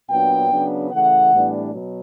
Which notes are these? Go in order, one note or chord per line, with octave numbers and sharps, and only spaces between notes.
A#2 F#3 B3 D4 G5
C#3 F#3 B3 D4
C#3 E3 A3 F#5
A2 E3 G3 B3 D4
B2 F#3